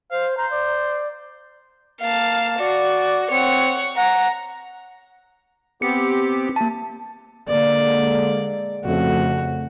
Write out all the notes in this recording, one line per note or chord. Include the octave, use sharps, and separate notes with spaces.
C5 F5
C5 A#5
D5
A#3 F5 A5
F#4 D5
C4 C#5 F#5
F#5 A#5
B3 C4 G4 C#7
A#3 A5
D3 G#3 A#3 D5
F2 C#3 A3 F#4